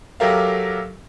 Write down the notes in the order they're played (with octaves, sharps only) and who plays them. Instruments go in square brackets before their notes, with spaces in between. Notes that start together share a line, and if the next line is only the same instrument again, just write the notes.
[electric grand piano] F#3 G4 A4 A#4 E5 F5